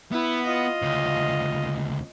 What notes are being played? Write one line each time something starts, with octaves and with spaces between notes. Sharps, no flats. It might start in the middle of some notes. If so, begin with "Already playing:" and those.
B3 E4
F4 D#5
D2 C#3